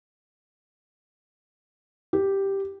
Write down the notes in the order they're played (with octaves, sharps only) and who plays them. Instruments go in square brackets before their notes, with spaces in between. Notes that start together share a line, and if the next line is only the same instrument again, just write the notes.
[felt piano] G4